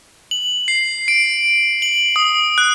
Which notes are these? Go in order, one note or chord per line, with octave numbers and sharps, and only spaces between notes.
F#7
C7
D7
F#7
D#6
F#6